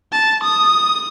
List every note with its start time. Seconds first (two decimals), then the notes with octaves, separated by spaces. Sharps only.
0.12 A5
0.43 D#6